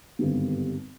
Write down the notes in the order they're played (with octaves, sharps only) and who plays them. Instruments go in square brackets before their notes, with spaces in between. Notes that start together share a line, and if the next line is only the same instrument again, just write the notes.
[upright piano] G#1 G2 D3 G3 B3